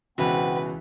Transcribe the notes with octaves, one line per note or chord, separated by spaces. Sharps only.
C#2 B2 E3 B3 C4 F#4 B4